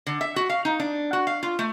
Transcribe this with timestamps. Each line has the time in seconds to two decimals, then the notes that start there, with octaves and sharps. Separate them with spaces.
0.06 D3
0.21 E5
0.36 F#4
0.50 F5
0.65 D#4
0.80 D4
1.13 F#4
1.27 F5
1.43 F4
1.59 A3